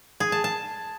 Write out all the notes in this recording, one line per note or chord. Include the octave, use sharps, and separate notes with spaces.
G#4
A5
A5